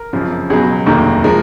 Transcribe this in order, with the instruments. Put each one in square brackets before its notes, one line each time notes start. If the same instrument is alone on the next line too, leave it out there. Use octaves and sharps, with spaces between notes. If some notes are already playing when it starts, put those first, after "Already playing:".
Already playing: [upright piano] A#4
G#1 F#2 C#3 F3
C#2 B2 F#3 G#4
F1 D#2 D#3 F#3 A#3
F3 G#3 A#4